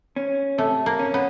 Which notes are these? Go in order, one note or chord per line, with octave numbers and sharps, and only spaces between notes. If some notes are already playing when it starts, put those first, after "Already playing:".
C#4
C3 A3
A#3
C#4
B3